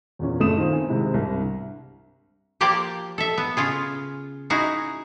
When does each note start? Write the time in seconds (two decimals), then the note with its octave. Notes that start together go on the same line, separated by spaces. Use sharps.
0.19 E2 A#2 C#4
0.40 F#1 A3 D#6 E7
0.57 D#3 C4 F4
0.73 G#5
0.88 G#2 C3 D#3 G#3 E4
1.14 C2 G2
2.61 F3 A#3 G4 C5 D5
3.18 A4 E5
3.38 B3
3.57 C#3 F4 G#4
4.50 C#4 D#4 E4 F#4 G#4